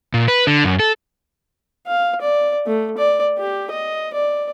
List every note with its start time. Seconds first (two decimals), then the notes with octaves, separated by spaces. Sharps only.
0.14 A#2
0.28 B4
0.47 D3
0.64 F#2
0.79 A4
1.87 F5
2.21 D5
2.66 A3
2.98 D5
3.38 G4
3.71 D#5
4.14 D5